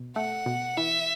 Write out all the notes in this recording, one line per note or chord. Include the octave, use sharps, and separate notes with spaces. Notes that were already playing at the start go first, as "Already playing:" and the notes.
Already playing: B2
A3 F#5
B2
E3 E5